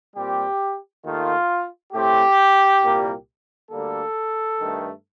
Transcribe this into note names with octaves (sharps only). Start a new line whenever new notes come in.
A#2 G3 C4 G4
D#2 D#3 A3 F4
A2 A3 C4 G4
C2 A#2 G3 A#3
D2 D3 G3 A#3 A4
G2 D#3 A3